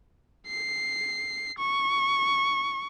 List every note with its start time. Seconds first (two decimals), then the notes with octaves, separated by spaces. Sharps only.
0.47 C7
1.58 C#6